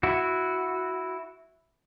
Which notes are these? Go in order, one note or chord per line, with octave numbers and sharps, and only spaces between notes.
E4 F#4